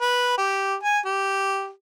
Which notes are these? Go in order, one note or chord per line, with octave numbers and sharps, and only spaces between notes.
B4
G4
G#5
G4